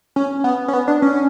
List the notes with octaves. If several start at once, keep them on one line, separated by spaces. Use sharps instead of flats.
C#4
B3
C#4
B3
D4
C#4